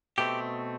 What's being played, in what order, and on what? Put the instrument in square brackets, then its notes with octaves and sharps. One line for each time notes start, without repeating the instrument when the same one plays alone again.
[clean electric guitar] B2 A3 C4 G4